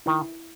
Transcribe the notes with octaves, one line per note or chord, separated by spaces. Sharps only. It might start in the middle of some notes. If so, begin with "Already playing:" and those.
D#3 E4